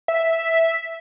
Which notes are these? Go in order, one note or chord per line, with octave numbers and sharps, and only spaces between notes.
E5